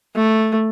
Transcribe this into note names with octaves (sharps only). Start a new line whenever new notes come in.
A3